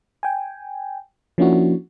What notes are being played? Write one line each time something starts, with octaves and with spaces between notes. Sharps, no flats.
G5 G#5
F3 A#3 C#4 D4 E4 F#4